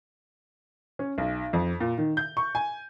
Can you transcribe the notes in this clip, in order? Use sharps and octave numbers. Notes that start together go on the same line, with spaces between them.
C#4
B1
F2
A#2
D#3
G6
C#6
G#5